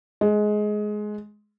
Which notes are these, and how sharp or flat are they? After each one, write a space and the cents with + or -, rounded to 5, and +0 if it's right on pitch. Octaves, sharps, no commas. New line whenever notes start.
G#3 +15